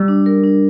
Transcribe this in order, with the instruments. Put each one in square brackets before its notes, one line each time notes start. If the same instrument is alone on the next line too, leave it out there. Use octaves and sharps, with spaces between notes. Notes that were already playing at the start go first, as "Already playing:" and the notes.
Already playing: [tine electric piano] G3
[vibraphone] D4
A#4
D4